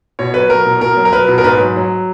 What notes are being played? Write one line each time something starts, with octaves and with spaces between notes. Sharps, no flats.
B2 C#5
F#3 B4
F#3 A#4
B2
B2 A#4
F#3
A#4
F#3 B4
B2
A#4
G#2 B4
F#3
F#3